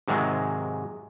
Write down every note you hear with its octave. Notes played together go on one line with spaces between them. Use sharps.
G#2 C3 D#3 F#3 G#3